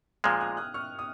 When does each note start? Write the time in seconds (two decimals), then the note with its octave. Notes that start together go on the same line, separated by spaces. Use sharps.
0.24 A#2 F3 G#3 F6 G#6
0.41 D#6 F#6
0.57 D#6 F#6
0.74 C#6 F6
0.99 D#6